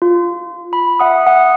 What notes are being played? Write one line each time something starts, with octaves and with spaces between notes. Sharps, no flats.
F4
B5
E5 F#5 D#6
F#5 D#6